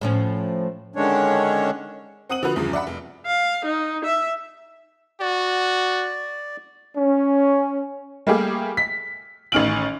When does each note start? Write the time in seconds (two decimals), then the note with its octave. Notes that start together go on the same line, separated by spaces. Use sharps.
0.01 A2 F3 C#4
0.96 D3 D#3 G#3 C#4 D4 C#5
2.29 C4 F#5 D#6 D#7 F#7
2.43 D3 F3 F#4 B4
2.56 E2 G2 C#3 F3
2.73 D5 E5 F#5 B5
2.87 F1
3.26 F5
3.65 D#4
4.05 E5
5.21 F#4 D5
6.96 C#4
8.27 G3 A3 A#3 G4 G#4
8.77 B6
9.52 A1 D#3 C#4 F6 D7 F#7